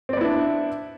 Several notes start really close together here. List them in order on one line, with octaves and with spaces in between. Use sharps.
C4 D5 B3 E4 D4